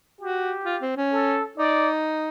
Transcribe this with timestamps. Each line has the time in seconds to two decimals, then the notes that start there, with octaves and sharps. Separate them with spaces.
0.21 F#4 G4
0.66 F4
0.82 C4
0.97 C#4
1.12 A4
1.57 D#4 D5